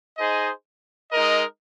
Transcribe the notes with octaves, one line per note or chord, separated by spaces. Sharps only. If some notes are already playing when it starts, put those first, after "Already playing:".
D#4 G#4 C5 D#5
G#3 D#4 A#4 D#5